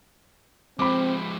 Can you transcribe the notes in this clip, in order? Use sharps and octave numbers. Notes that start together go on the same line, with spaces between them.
F3 G#3 C4 B5 D6